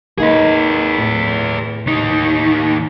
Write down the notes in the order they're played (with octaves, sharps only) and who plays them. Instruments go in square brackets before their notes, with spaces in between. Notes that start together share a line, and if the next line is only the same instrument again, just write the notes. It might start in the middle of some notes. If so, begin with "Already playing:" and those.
[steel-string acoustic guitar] A#3 D#4 [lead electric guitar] G#4 B4
[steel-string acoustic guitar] A2
[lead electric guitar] D#2 D#4